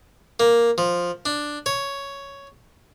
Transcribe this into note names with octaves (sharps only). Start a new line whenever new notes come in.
A#3
F3
D4
C#5